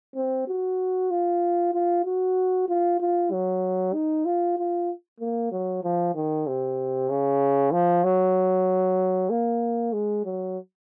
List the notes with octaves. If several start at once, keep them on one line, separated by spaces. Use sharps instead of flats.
C4
F#4
F4
F4
F#4
F4
F4
F#3
D#4
F4
F4
A#3
F#3
F3
D#3
C3
C#3
F3
F#3
A#3
G#3
F#3